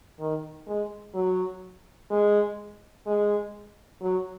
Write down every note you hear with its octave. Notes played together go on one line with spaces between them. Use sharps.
D#3
G#3
F#3
G#3
G#3
F#3